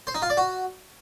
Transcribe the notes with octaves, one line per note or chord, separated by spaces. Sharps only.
C5
D#4
F4
D5
F#4